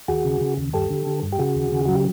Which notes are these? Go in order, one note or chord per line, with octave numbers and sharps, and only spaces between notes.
D#2 F#4 G#4
C#3
C#3
D#2
G2 G4 A4
D3
D3
G2
G4
C#3 F#4 G#4
D#2
C#3
F#3 F#4
G4